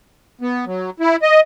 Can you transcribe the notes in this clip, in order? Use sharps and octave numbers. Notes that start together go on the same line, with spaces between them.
B3
F#3
E4
D#5